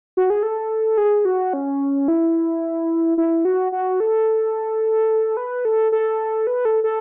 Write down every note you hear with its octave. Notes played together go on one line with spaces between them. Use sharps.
F#4
G#4
A4
G#4
F#4
C#4
E4
E4
F#4
F#4
A4
B4
A4
A4
B4
A4
A4